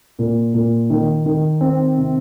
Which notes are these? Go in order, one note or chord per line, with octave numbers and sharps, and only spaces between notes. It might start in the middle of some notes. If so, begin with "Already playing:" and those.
A#2
A#2
D#3
D#3
C4
C3